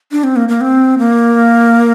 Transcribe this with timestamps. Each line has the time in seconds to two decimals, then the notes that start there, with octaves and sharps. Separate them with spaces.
0.12 D4
0.24 C4
0.36 A#3
0.48 A#3
0.61 C4
0.99 A#3